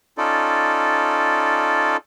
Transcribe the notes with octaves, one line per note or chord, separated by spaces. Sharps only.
C#4 D#4 F4 A4 D5